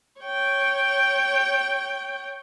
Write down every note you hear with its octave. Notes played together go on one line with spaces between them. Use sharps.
C#5 G5